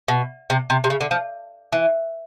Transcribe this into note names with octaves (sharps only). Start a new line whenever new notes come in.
B2
C3
C3
C3
C#3
D3
F3
E3